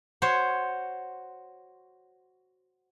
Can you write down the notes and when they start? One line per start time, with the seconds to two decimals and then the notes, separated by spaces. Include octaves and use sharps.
0.22 F#4 C5 C#5